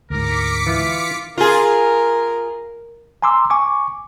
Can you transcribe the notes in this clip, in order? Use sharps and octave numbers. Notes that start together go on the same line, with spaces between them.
D2 G#2 A#4 D6 B6 C#7
E3 E4 F4 F5
F4 G#4 A#4
G#5 A#5 C6 D6 E6
G#5 C#6 D6